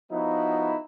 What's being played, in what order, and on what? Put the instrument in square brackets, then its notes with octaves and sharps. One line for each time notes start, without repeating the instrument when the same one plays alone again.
[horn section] F3 B3 D#4 E4 F#4